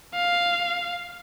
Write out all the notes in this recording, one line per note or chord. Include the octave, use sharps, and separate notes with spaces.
F5